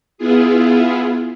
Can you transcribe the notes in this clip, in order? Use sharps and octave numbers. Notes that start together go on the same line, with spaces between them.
B3 E4 F4 G#4